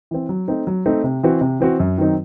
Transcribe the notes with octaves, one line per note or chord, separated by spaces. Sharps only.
E3 C4
F#3
A3 C4 D#4
F#3
A3 C4 D#4
C3
E3 C4 F#4
C3
E3 C4 F#4
F#2
D#3 F#3 C4 D#4